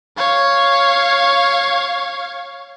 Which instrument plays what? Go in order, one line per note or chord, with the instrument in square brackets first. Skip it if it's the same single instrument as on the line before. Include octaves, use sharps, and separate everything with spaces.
[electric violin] C#5 F5